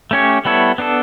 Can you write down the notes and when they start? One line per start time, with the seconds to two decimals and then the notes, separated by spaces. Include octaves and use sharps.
0.11 A3 C#4 G4 C#5
0.45 G3 B3 E4 A4 C#5
0.78 B3 D4 A4